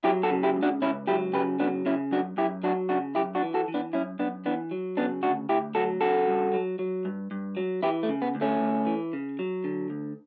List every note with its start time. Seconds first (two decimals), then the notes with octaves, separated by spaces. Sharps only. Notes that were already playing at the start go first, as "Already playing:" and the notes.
0.04 F#3 E4 G4
0.23 F#4 A4
0.31 C#3
0.43 E4 G4
0.56 C#2
0.63 D4 F#4
0.82 C#2 C#4 E4
1.07 F#3 E4 G4
1.33 C#3 G4 B4
1.59 F#3 B3 D4
1.86 C#3 C#4 E4
2.11 F#2 D4 F#4
2.37 F#2 E4 G4
2.63 F#3 D4 F#4
2.89 C#3 D4 F#4
3.15 F#2 E4 G4
3.35 D4 F#4
3.42 E3
3.54 F#4 A4
3.68 E3
3.74 B3 D4
3.93 F#2 C#4 E4
4.19 F#2 B3 D4
4.46 E3 B3 D4
4.71 F#3
4.97 C#3 B3 D4
5.23 D2 D4 F#4
5.49 D2 E4 G4
5.75 F#3 F#4 A4
6.01 C#3 F#4 A4
6.28 G2
6.53 F#3
6.79 F#3
7.05 G2
7.31 G2
7.57 F#3
7.83 E3 E4 G4
8.03 A3
8.09 C#3
8.22 B3
8.35 D2
8.41 A3 C#4
8.60 D2
8.87 E3
9.13 C#3
9.39 F#3
9.64 D3
9.90 D2